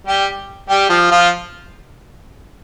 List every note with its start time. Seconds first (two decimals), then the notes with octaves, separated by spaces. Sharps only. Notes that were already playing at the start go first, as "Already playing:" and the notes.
0.07 G3 G4
0.69 G3 G4
0.89 F3 F4
1.11 F3 F4